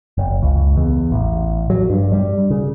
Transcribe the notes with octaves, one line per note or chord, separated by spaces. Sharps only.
F#1
C#2
E2
A1
F#3
G2
G3
C#3